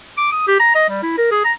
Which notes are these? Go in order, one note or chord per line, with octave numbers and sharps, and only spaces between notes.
D6
D#6
G4
A#5
D#5
G3
E4
A#4
G#4
A#5